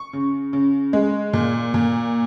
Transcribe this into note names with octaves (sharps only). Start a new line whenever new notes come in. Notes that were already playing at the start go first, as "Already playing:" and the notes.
Already playing: C#6
C#3
C#3
G#3
A#2
A#2